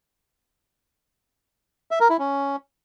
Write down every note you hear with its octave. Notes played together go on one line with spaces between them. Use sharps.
E5
A#4
E4
C#4